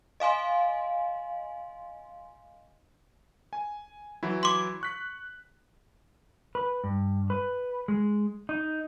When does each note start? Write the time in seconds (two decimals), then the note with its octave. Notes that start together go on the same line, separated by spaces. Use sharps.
0.20 D#5 F5 G#5 C6
3.53 G#5
4.23 E3 F#3 E4
4.43 C6 D6
4.81 C#6 F#6 B6
6.55 B4
6.84 G2
7.30 B4
7.88 G#3
8.49 D#4